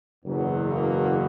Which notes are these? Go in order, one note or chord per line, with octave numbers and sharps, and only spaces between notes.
F#1 E2 B2 F#3
A#3